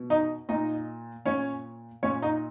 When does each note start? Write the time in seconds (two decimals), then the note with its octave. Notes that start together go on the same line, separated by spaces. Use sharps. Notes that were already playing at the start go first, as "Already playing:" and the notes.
Already playing: B2
0.10 D#4 D#5
0.49 A#2 D#4 D#5
1.26 A#2 C#4 C#5
2.03 A#2 C#4 C#5
2.22 D#4 D#5